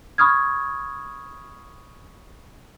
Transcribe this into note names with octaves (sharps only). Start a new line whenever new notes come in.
B5 C#6 D#6 F6 G#6